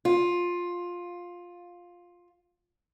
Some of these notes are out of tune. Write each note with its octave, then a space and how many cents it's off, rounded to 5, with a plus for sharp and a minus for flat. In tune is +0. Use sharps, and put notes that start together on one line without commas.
F4 +10